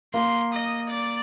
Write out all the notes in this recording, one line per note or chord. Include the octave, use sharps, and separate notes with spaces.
A#3 C6
D#5
D5